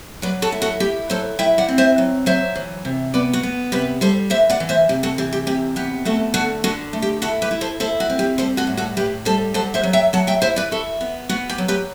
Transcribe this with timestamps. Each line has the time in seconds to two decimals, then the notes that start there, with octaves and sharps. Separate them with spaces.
0.22 F#3 B4 D5
0.42 F#4 A4
0.52 E4
0.62 F#4 A4
0.80 E4 G4
1.09 F#3 A4 C5
1.39 E4 E5 G5
1.58 D5 F#5
1.69 C4
1.78 C5 E5
1.98 F#3
2.26 F#3 C5 E5
2.55 E3
2.85 C3
3.14 B3 B4 D5
3.33 F#4
3.43 B3
3.72 C3 G4 B4
4.01 G3 A4 C5
4.30 E3 C5 E5
4.50 D5 F#5
4.60 E3
4.69 C5 E5
4.89 C3 G4
5.03 F#4 A4
5.18 E3 G4
5.33 G4
5.47 C3 G4
5.76 B3 G4
6.05 A3 F#4 A4
6.34 D3 F#4 A4
6.64 D3 F#4 A4
6.93 A3
7.02 G4
7.22 E4 F#4 A4
7.42 G4 B4
7.51 E4
7.61 A4 C5
7.80 E4 A4 C5
8.00 F#4
8.10 C4
8.19 G4
8.38 G3 A4 C5
8.57 F#4 A4
8.67 A2
8.77 F#4 A4
8.97 A2 G4 B4
9.25 G3 A4 C5
9.54 F#3 A4 C5
9.74 C5 E5
9.83 F#3
9.93 E5 G5
10.13 F#3 F#5 A5
10.27 E5 G5
10.42 E4 C5 E5
10.56 B4 D5
10.71 E4 F#4 A4
11.01 B3
11.29 B3 F#4
11.49 G4
11.58 F#3
11.68 G4 B4